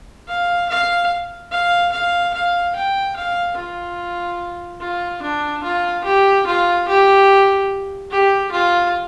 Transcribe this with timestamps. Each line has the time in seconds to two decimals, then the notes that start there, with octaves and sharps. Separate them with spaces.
0.28 F5
0.70 F5
1.51 F5
1.92 F5
2.34 F5
2.75 G5
3.16 F5
3.57 F4
4.81 F4
5.22 D4
5.63 F4
6.04 G4
6.46 F4
6.87 G4
8.11 G4
8.51 F4